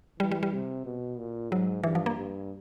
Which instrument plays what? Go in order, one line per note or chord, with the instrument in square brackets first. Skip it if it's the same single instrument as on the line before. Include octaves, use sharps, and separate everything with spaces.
[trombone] E3 [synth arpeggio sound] G3
[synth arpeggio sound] G3
G3
[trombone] C3
B2
A#2
[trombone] G#2 [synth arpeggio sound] F#3
[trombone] G2 [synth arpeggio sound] E3
[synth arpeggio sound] F3
A#3
[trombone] G2